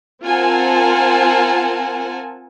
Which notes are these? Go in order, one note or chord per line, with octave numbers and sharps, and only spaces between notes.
C4 F4 A#4 F#5 G#5 A5